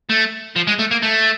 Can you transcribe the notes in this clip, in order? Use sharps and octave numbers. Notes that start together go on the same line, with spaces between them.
A3
F3
G#3
A3
A#3
A3